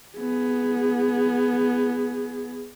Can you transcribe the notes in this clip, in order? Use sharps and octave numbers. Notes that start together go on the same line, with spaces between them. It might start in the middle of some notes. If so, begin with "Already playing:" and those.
B3 G#4